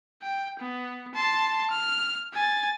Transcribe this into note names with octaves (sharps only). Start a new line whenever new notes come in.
G5
B3
A5 C6
F6
G#5 A6